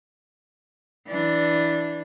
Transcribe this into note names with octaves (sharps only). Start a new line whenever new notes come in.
E3 D4